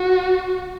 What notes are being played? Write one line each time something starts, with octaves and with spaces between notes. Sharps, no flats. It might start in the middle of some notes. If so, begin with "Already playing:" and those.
Already playing: F#4